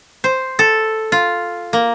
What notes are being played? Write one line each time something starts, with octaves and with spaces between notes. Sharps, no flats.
C5
A4
F4
A#3